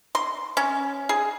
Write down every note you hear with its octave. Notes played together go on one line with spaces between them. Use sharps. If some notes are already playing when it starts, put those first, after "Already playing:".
C6
C#4
G#4